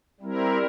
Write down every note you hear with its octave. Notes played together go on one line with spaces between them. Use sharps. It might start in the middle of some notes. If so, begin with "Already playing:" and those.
G3 C4 E4 A#4